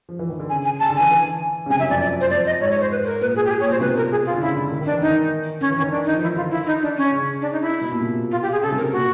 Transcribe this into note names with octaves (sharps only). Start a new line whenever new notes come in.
F3
E3
D#3
D3
C#3 G#5
G#5
C#3 A5
D3
E3 G#5
E3
C#3
C3 G#5
F#2 E5
F2 D5
D5
C5
F2 D5
D#5
G#2 C#5
C#5
C5
B4
A#4
A#2 B4
G#4
G4
G#4
A#2 C#5
B2 C5
C3 B4
A#4
G#4
F4
D3
C#3 E4
D3
D#3
D#3
D4
E3
D#3 D#4
D#3 C#4
E3
C#4
D#3
D4
D#4
F3
E3 E4
D3 F4
E4
D#4
D4
C#4
C#3
D4
D#4
E4
B2
A#2
C3
F4
G4
G#4
C#3 A4
C3
A#4
A#2 F#4